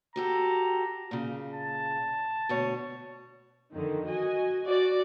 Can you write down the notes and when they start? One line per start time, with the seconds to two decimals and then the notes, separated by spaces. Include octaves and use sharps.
0.16 F#4 G4 A4 A#5
1.11 A#2 C#3
1.54 A5
2.49 D2 B2 C#5
3.73 F2 D3 D#3
4.07 F#4 D#5 G#5
4.64 F#4 D5